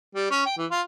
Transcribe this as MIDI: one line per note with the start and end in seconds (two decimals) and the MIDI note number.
0.15 0.26 55
0.30 0.44 61
0.46 0.53 79
0.58 0.66 52
0.71 0.81 65